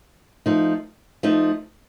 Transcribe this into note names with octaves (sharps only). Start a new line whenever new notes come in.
F3 A3 D#4
F3 A3 D#4